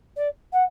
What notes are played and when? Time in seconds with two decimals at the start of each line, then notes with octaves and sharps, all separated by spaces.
0.16 D5
0.52 F#5